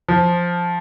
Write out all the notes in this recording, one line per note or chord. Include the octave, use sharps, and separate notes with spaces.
F3